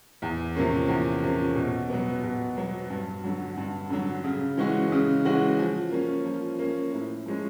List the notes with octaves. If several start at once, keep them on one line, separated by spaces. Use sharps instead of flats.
E2
C3 F3 A#3 C#4
E2
C3 F3 A#3 C#4
B2
F#3 B3
B2
F#3 B3
G2
D3 F#3
G2
D3 F#3
C#3
E3 G#3 C#4 F#4
C#3
E3 G#3 C#4 F#4
F3
A#3 C#4
F3
A#3 C#4
A2
F3 G#3 C#4